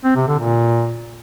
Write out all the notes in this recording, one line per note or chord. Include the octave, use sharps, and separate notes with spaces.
C4
C3
D3
A#2